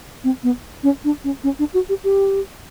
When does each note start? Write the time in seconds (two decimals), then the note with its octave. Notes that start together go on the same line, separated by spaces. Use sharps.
0.24 C4
0.43 B3
0.83 C#4
1.04 D4
1.24 C#4
1.44 C#4
1.59 D4
1.74 F#4
1.89 G4
2.04 G4